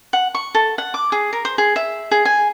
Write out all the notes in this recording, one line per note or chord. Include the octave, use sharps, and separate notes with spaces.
F#5
C#6
A4
F#5
D6
G#4
A#4
C5
G#4
E5
G#4
G#5